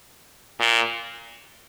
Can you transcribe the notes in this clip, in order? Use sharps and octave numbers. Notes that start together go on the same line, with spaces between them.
A#2